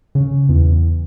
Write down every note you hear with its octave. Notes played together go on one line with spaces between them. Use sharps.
C#3
E2